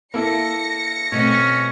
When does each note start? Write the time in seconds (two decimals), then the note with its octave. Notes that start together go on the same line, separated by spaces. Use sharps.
0.14 A#3 E4 A4 A#6 C#7
1.12 B2 A3 C4 C#4